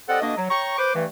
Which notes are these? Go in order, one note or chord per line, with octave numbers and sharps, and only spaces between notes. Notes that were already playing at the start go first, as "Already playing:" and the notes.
G3 C4 A4 D5 D#5 F#5
B2 A3 A#3 D4 D#5
F#3
C#5 G5 A#5 C#6
B4 C5 D6
G2 E3 A3